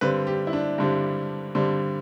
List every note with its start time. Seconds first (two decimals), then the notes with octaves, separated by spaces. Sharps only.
0.01 G2 D3 G3 C4 B4
0.27 G4
0.47 E4
0.53 D4
0.78 G2 D3 G3 C4
1.55 G2 D3 G3 C4